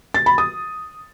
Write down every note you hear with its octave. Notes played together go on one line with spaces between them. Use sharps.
A6
B5
D#6